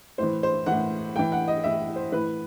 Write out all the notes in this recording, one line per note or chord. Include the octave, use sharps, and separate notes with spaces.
A2 E3 C5
C5
A2 E3 F#5
A2 E3 G5
F#5
D#5
A2 E3 E5
C5
A2 E3 B4